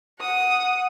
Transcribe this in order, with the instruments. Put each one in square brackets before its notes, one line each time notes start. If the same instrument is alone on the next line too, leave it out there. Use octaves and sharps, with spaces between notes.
[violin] F#5 D#6